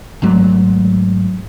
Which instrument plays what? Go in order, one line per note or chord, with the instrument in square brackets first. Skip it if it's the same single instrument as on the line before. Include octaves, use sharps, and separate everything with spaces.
[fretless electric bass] G#1 G#2 F#3 A3